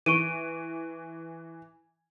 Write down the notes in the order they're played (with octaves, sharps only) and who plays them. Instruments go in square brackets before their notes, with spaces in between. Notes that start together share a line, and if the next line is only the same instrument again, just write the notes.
[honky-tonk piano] E3 [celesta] C#6 D7 D#7